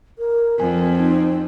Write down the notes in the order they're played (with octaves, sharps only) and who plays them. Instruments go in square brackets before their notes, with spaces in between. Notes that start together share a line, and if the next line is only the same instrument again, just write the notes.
[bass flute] A#4
[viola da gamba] F2 [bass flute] C4 [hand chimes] G#5
[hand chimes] D#4